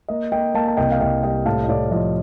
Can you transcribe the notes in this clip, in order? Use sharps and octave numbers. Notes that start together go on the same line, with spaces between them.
A#3 D#5
A#3 D#5 G5
A#3 F5 A5
A5
C2 D#5 G5
F5
C2 D#5 G5
G3 D#5 G5
A2 F5 A5
D#5
A2 D5 F5
F3 D#5